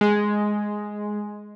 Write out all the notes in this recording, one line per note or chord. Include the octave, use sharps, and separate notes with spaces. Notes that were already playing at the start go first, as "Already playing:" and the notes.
G#3